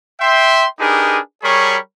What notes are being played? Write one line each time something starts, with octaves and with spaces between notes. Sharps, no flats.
E5 G5 C6
D4 D#4 G4 G#4 A#4 B4
G3 G#4 A#4 C#5 B5 C#6